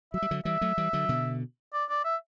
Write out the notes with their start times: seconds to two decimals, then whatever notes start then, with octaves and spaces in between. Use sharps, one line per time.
0.14 F#3 E5
0.22 G3
0.31 D3 F#3
0.45 E3 G3 E5
0.61 F#3 A3
0.77 E3 G3
0.93 D3 F#3
1.09 B2 D3
1.73 D5
1.89 D5
2.05 E5